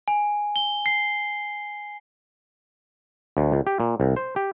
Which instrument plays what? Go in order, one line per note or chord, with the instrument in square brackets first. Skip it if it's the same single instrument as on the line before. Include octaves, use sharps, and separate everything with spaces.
[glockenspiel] G#5
G7
C7
[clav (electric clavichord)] D2
C#2
G4
A#2
C2
C5
G4